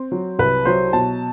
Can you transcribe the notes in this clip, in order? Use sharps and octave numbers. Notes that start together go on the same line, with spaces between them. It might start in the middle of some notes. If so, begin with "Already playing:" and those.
Already playing: C4
F#3
C2 B4
F#3 C5
B2 A5